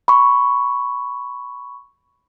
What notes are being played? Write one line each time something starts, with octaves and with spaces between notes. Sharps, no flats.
B5 C#6